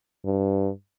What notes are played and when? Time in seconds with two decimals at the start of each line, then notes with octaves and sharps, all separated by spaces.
0.25 G2